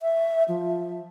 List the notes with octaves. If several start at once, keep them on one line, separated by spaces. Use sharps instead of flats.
E5
F3